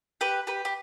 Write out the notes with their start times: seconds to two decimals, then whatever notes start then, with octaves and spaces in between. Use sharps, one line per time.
0.21 G4 B4
0.47 G4 B4
0.65 G4